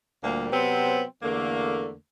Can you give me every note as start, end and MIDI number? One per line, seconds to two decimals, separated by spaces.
0.24 0.47 38
0.24 0.47 46
0.24 0.47 55
0.24 0.47 58
0.52 1.03 48
0.52 1.03 54
0.52 1.03 59
0.52 1.03 60
1.23 1.94 40
1.23 1.94 50
1.23 1.94 57
1.23 1.94 58